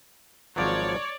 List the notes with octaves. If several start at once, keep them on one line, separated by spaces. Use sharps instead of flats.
G#1 F3 F#3 C#5 D5